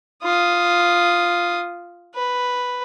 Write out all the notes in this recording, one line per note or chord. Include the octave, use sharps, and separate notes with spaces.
F4 D#6
B4